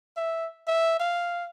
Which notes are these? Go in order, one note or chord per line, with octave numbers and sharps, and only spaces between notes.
E5
E5
F5